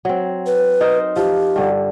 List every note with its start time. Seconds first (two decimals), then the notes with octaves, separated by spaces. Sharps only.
0.05 F#3 C4
0.47 B4
0.81 D#4 A#4 C5
1.16 F3 G4
1.56 G2 D3